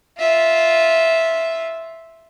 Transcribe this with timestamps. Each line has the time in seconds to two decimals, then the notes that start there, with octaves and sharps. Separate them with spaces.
0.18 F4 E5